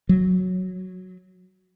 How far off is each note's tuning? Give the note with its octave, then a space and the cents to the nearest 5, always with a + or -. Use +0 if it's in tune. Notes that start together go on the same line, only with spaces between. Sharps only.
F#3 -5